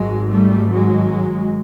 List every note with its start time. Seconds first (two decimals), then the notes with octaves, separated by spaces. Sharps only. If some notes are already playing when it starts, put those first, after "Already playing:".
Already playing: G#1 G#2 F#3 G#3
0.31 G3 A3
0.72 F#3 G#3